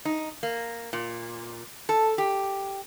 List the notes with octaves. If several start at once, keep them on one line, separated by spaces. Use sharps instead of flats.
D#4
A#3
A#2
A4
G4